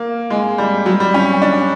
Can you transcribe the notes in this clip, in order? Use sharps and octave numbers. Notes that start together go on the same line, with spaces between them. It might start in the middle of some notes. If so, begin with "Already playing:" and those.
Already playing: A#3
G#3
G3
F#3
G3
C#4
D4